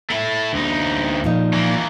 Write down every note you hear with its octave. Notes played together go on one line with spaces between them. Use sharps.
A3 E4
D2 D#4
A#2 F3 D#4
E3 A#3